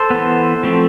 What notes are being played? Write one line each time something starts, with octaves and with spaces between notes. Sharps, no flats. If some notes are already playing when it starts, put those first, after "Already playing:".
Already playing: A4 C5
E3 B3
F3 A3 C4